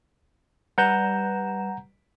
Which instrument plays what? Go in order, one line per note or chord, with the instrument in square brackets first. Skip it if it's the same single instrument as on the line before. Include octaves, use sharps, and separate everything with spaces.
[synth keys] G3 B4 E7 [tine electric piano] F#5 A#5 G6